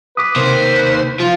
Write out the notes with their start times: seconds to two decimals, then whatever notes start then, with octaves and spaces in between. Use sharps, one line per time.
0.17 B4 D6 D#6
0.36 C3 D#3 A#3 C5
1.20 F3 F4